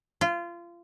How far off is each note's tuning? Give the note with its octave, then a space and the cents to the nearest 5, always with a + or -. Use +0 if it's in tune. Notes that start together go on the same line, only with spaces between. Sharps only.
F4 -25